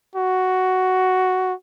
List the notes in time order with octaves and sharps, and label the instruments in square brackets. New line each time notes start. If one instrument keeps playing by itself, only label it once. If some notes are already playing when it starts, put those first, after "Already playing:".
[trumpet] F#4